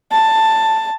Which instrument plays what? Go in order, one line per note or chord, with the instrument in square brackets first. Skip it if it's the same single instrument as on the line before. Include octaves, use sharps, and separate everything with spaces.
[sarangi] A5